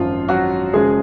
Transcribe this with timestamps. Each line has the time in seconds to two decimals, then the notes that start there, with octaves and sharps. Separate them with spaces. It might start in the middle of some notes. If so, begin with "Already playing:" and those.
Already playing: G#1 F#2 F3 F4
0.28 F#3 F#4
0.73 F#1 F#2 F3 G#3 G#4